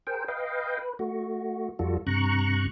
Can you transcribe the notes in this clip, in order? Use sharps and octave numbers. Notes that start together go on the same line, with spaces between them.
G#4 A#4 C5 G5
B4 D#5 F5 G5
B4
A3 F#4
F2 G3 F4 F#4 A4
G2 C3 A#5 C#6 F#6